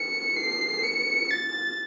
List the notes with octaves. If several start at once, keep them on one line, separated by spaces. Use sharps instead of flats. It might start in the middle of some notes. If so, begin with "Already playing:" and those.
Already playing: C#7
C7
C#7
A6